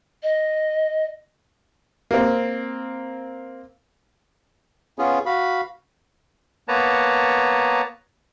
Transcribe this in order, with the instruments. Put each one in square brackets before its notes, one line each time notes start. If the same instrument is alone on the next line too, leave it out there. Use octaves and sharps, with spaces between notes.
[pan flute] D#5
[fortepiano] A#3 C4
[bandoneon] B3 C#4 F4 G#4
F#4 F5 B5
[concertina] A#3 B3 B4 C#5 A5 A#5